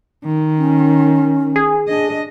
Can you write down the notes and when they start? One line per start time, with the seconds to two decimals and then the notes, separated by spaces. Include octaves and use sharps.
0.25 D#3
0.58 C#4
1.56 G#4
1.89 D4 D#5